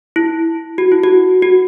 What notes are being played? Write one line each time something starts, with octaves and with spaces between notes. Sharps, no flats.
E4
F#4
E4
F#4
F#4